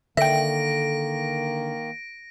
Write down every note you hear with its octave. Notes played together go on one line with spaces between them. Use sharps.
D3 D#3 A#3 E5 G5 A#6 D7